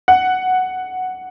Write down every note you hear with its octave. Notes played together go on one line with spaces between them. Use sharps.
F#5